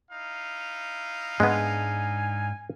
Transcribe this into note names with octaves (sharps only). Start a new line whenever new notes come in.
D#4 E4 F5
G#2 G#3 B3 D4 G#5